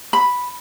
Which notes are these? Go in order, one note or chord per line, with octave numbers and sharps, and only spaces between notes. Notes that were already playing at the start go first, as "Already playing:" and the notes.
B5